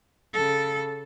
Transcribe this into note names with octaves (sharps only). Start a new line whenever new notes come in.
C#3 A4